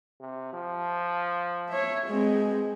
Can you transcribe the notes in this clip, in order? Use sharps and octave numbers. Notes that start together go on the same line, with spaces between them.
C3
F3
C#5 E5
B2 G#3 C4